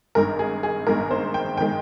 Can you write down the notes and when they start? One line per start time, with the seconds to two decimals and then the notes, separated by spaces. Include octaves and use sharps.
0.15 G#1 G2 D#3 G#3 A#4
0.39 G#4
0.63 G#4
0.86 G#1 G2 D#3 G#3 A#4
1.11 C5
1.34 G5
1.57 G5
1.60 D#3 G#3